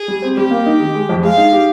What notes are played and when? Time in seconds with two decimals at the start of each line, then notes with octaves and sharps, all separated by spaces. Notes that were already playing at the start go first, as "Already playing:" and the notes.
Already playing: G#4
0.08 G3
0.22 C4
0.37 G3 G4
0.51 A#3
0.66 D#4
0.80 D#3
0.95 G#3
1.09 F2
1.23 G#3 F5
1.37 D#4
1.53 G4